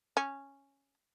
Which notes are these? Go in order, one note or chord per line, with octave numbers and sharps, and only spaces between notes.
C#4